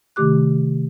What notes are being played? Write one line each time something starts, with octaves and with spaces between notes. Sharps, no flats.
C3 D#3 A3 G4 D6 F#6